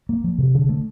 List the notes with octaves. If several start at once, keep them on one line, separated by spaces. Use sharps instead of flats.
A#3
F3
C3
D3
A3